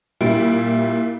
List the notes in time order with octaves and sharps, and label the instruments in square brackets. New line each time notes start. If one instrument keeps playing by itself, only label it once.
[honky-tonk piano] A#2 G3 E4 D7